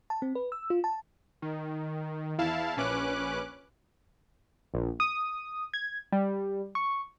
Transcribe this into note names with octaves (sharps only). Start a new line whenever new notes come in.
A5
C4
B4
E6
F4
A5
D#3
E2 E4 F5 A5
A#1 C#4 B4 D6 F#6
A#1
D#6
G#6
G3
C#6